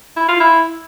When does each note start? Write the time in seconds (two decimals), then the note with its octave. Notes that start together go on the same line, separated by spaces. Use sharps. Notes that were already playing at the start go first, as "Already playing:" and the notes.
0.17 E4
0.28 F4
0.40 E4